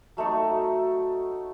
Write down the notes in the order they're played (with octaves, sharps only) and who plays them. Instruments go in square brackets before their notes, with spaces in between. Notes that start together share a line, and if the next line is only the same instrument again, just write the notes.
[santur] F#3 A3 D#4 C#6